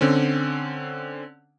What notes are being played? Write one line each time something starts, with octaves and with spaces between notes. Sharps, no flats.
D3 C4 C#4